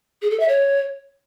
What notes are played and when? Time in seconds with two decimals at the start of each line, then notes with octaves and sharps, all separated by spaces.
0.22 G#4
0.31 A4
0.40 E5
0.48 C#5